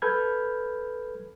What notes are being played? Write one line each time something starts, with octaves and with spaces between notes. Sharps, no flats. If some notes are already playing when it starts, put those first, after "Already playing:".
A4 B4 B5 F6 G6 G#6